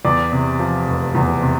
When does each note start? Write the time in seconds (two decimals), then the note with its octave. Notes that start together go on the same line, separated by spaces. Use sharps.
0.05 E2 D5
0.32 C3
0.60 F3
0.87 F1
1.15 E2
1.42 C3